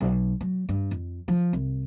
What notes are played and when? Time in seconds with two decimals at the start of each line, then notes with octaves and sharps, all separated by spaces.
0.01 B1
0.41 F#3
0.69 G2
0.91 F2
1.28 F3
1.53 C2